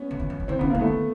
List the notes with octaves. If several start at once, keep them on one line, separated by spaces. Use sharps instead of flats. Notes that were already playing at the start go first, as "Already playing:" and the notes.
Already playing: B3 C#4
D3
E3
F3
D#3
D3 C4
C#3 B3
D#3 A#3
A3 B3
D#3